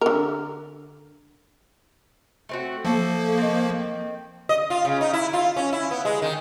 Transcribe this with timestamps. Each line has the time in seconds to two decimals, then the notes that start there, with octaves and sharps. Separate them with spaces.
0.01 D3 A#4
2.49 A3 C4 F#4
2.85 F3 A3 A#3 A4
3.38 D#3 C4
4.49 D#5
4.70 F4
4.85 C#3
5.01 D#4
5.13 E4
5.33 F4
5.56 C#4
5.73 E4
5.91 B3
6.05 G#3
6.22 D#3